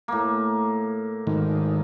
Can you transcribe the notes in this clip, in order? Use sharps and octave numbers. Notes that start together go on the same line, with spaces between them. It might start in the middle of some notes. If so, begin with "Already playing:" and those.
A2 A#3
G#2 D#3